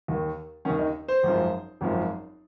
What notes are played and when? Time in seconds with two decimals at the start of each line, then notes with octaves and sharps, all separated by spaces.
0.08 D#2 D#3
0.65 D#2 D#3 C#4
0.79 D#4
1.08 C5
1.23 G#1 F#2 F3
1.81 G#1 F#2 F3